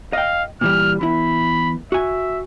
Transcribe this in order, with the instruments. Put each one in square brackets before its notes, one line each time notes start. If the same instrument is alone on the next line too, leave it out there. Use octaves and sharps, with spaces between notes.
[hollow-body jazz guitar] D#5 G5 [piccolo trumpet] F5
[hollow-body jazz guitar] A#2 E3 G3 [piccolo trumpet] F6
[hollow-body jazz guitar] E2 E4 [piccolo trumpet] B5
[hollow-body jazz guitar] F#4 G#5 [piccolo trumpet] E5